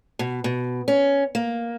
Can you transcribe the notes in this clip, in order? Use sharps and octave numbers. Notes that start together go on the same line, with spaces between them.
B2
B2
C#4
A#3